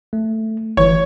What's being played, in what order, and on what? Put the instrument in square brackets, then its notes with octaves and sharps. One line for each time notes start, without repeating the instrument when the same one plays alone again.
[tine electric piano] A3
[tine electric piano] G1 E3 [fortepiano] C#5